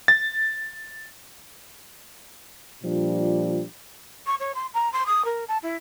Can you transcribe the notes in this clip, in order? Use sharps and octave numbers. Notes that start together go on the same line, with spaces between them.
A6
A#2 F3 G3 D4
C#6
C#5
C6
A#5
C6
D#6
A#4
A5
E4